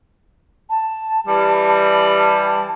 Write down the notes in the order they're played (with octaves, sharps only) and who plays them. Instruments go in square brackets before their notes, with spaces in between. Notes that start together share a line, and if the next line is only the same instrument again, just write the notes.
[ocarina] A5
[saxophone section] E3 G3 [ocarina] A5
[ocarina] A5
A5